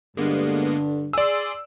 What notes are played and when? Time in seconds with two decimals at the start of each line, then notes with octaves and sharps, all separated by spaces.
0.17 G2 D3 G#3 A#3 B3
1.13 G#4 D5 C6 E6